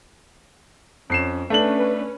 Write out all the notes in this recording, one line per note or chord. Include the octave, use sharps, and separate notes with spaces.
F2 C#4 C7 E7
A3 C#4 D4 B4 F#7